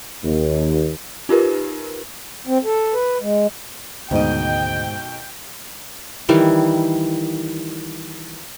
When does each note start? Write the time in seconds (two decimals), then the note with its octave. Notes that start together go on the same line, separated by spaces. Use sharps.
0.23 D#2
1.29 D#4 F4 G4 A#4 B4
2.47 C4
2.64 A4
2.94 B4
3.21 G#3
4.11 D2 G#2 B2 D#3 G#3 D#4 D#5 G5
6.29 D#3 E3 G3